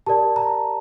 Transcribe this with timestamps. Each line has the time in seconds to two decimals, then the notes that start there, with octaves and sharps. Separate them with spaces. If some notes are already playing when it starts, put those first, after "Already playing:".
0.07 G4 A#4 D5 A5
0.36 A#5